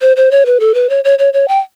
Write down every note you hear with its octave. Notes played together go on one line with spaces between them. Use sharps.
C5
C5
C#5
B4
A4
B4
C#5
C#5
C#5
C#5
G5